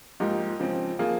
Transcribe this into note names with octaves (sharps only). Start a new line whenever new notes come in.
G#2 F3 A#3 D#4 G4
C#3 F3 C4
F3 A#3 F4 G#4